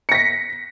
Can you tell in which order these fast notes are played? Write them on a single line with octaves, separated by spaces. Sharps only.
C#7 A#6 B6